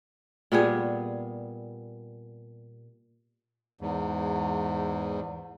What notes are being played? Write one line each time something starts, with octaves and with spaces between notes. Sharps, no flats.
A#2 G3 B3 G#4
E2 G#2